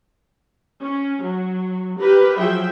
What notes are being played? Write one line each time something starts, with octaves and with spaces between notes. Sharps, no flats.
C#4
F#3
G4 A#4 B4
F3 F#3 G#4 E5 G5